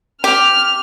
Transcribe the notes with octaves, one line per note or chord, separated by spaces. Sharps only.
G4 F6